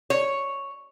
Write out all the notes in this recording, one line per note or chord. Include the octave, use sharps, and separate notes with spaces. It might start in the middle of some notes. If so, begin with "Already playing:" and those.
C#5